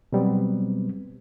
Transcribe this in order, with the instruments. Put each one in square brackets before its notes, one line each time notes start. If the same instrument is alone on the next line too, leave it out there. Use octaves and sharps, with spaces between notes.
[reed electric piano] B2 F#3 G3 B3 C4